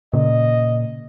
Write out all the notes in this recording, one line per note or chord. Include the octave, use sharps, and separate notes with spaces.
A#2 C#3 D#5